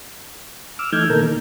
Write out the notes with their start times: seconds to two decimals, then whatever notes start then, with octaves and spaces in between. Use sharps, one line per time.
0.79 D6 E6 F6
0.92 E3 A3 D#4 F6 G6 G#6
1.10 B2 D#3 A#3 A4 A#4
1.22 D#3 A#3